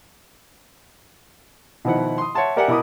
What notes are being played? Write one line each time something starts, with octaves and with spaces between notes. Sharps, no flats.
B2 D#3 F3 E4 F#5
C6 D#6
C#5 E5 F#5 A5 C6
G4 A#4 D5 E5 F#5 G#5
B2 E4 A#4 D6 D#6